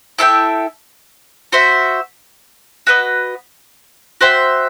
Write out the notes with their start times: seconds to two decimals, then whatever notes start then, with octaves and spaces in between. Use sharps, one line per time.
0.19 E4 A4 E5 G5
1.52 F#4 C5 E5
2.87 F#4 B4 D#5
4.21 F#4 C5 E5 G5